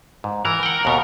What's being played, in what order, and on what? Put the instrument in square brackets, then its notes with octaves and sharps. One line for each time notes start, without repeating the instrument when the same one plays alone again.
[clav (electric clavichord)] G#2
[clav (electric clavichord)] E3 [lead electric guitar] A#4
[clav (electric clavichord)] F#5 G5
D#2 B2